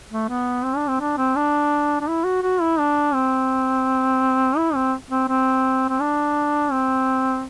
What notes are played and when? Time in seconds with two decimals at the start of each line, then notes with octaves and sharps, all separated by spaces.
0.11 A3
0.29 B3
0.64 C4
0.76 D4
0.88 C4
1.00 D4
1.17 C4
1.36 D4
2.01 D4
2.08 E4
2.25 F#4
2.43 F#4
2.61 E4
2.79 D4
3.14 C4
4.57 E4
4.75 C4
5.11 C4
5.28 C4
5.89 C4
6.00 D4
6.72 C4